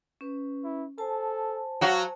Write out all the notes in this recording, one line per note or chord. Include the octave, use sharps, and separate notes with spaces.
C#4 B4
E4
A4 C5 G#5 A5
F#3 F#4 F5